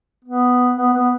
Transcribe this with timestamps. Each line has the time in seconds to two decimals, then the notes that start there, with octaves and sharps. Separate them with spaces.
0.24 B3
0.76 B3
0.94 B3